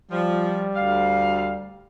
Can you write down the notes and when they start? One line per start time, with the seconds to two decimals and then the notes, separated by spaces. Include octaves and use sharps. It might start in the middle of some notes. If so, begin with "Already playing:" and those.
0.11 F3 G3
0.76 D2 F5